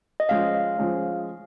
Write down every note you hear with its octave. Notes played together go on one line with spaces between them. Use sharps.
D#5
F3 G#3 C#4 F5
F3 G#3 C#4